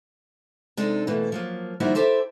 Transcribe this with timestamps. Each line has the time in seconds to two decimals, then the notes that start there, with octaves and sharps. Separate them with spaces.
0.77 C3 G#3 D4 D#4 A4
1.07 B2 E3 A3 A#3
1.32 F3 F#3 A#3
1.80 D#3 F3 G3 A#3 E4 F#4
1.95 E4 G4 A4 C5